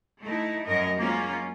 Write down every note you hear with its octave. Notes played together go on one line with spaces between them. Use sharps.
A3 D#4 E4
F#2 A#4 D#5
F#3 G#3 A#3 C#4 F4